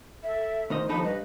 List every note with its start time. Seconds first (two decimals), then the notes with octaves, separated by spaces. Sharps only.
0.23 A4 E5
0.70 D2 D#3 C5 D#5
0.89 D#2 F3 D#4 A4 B5
1.05 G2 B4 D#5